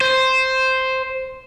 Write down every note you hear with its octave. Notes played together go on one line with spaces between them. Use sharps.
C5